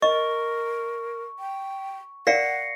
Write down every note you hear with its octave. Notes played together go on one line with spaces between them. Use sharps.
A#4 D#5 C#6
G5
A#4 D5 F5 F#5 A#6 C7 C#7